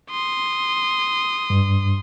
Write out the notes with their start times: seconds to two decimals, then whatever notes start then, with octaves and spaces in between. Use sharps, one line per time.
0.10 C6 D#6
1.50 G2